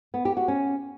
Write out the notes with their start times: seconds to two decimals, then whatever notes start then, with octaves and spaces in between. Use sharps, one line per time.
0.14 B3
0.25 G4
0.37 F#4
0.48 C#4